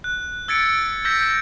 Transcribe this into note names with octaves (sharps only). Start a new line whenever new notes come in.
F#6
E6 G#6 A6 B6 C#7 D7
E6 G6 G#6 A#6 B6